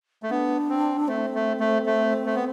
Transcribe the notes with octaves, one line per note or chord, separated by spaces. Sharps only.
A3
B3 D4
C4
A3 C4
A3
A3
A3
A3
B3